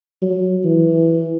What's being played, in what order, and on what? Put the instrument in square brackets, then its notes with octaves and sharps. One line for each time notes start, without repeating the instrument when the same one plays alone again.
[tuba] F#3
E3